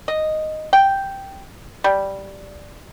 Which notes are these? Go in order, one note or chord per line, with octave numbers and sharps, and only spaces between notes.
D#5
G5
G3